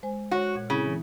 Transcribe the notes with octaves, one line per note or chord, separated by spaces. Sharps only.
G#3 C5 G#5
G#3 F#4 C#5 A#6
A#2 G#6
C#3 C4 E4
E3